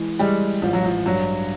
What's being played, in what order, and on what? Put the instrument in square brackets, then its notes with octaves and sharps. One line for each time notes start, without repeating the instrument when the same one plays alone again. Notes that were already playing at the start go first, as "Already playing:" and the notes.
Already playing: [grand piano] E3 G#3
[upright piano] G3 [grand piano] G#3
[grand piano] A1 [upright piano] F3
[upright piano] F#3
F3
[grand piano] G2 [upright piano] F#3